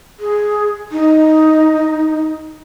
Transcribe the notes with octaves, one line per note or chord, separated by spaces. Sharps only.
G#4
D#4